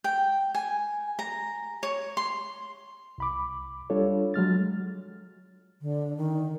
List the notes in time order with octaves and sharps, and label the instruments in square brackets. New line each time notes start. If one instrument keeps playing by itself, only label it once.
[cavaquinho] G5
G#5
A#5
C#5
C6
[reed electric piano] C2 B5 D6
G3 D4 F4 A4 C#5
F#3 G#3 F6 A6
[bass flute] D3
D#3